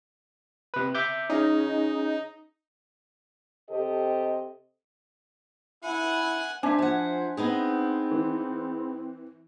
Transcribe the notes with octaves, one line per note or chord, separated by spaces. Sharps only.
C3 B4
E5 D6 G6
C#4 D#4 G#4
C3 G4 A4 C5 D#5
E4 F#5 G#5
D4 C5 E5 G#5
F3 F#5
B3 C4 D#4 G#4
E3